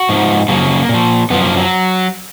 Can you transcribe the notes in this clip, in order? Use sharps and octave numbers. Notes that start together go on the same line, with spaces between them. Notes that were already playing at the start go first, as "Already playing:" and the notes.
Already playing: F#4
G#2 F3
F#2 C#3 F3 A#3
A#2 F3
F#2 F3 B3
A#3
F#3